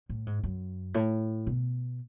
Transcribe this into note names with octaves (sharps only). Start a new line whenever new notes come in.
A2
G#2
F#2
A2
B2